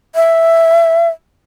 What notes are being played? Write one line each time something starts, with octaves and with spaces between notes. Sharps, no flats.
E5